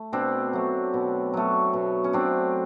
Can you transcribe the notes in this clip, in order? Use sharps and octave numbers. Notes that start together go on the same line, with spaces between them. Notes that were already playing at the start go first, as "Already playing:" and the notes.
Already playing: A3
B2 C4 D4
F#3 A3
B2
F#3 A3
B2
C#4
F#3 A3 C4 D4